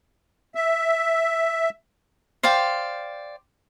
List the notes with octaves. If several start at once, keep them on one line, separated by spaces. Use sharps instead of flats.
E5
C5 D5 F5 G5